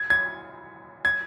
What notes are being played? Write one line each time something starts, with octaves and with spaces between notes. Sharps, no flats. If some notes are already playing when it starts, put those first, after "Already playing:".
Already playing: G#6
G#6
G#6